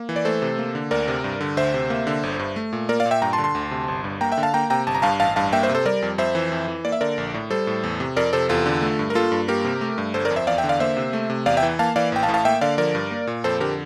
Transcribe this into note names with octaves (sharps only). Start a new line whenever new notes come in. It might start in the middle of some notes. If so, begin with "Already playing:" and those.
Already playing: A#3
E3
D5
A3 A4 C5
C3
A#3
D3
D2 A#4 D5
C3
G2
D3
D2 C5 E5
C3
A#3
D3
G1
G2
A3
A#2
A#3 A#4 D5
D5 F5
A#2
E5 G5
G2 G5 A#5
A5 C6
D3
A5 C6
D2
C3
G1
G2
A#3 G5 A#5
E5 G5
D3
F5 A5
A#3 G5 A#5
C3 G5 A#5
G1 A5
A#5
G2 F5 A5
A1 F5 A5
G2 F5 A5
A#3 E5 G5
C5 E5
C3
A4 C5
G3 A#4 D5
F2
F2 C5 E5
E3
F2
E3
A#3 D5
E5
D3 A#4 D5
A#1
A2
G3 A4 C5
A2
E2
C3
F2 A#4 D5
C3 A4 C5
E2 F4 A4
D3
A3
G2
A#4
A#3 F4 A4
G2
A#3 G4 A#4
C3
A3
G2
G1 A4 C5
A#4 D5
F2
C5 E5
E2 D5 F5
E5 G5
D3
D5 F5
A#3 C5 E5
C3
A3
C3
E2 D5 F5
E5 G5
E3
A#3 F5 A5
E3 D5 F5
A1 G5
F5 A5
A2
F5 A5
A#3 E5 G5
D3 D5 F5
F3 A#4 D5
G2
A#3
A#2
F2 A4 C5
D3 G4 A#4